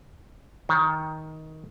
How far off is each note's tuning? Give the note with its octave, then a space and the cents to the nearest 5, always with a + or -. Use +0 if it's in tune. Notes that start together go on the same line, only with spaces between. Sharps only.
D#3 +15